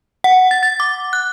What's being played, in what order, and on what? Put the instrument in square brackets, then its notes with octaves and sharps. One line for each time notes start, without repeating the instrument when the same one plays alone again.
[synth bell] F#5
A6
A6
D6
F#6